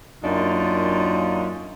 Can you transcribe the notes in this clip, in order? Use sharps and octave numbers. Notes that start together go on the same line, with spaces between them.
F#2 A#3 D4 D#4 F4